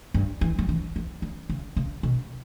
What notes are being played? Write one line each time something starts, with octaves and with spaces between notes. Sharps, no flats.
G2
E3
F#3
E3
E3
D3
C#3
C#3
B2